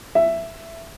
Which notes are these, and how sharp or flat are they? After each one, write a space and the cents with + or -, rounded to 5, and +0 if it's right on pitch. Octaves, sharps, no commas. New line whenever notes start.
E5 +10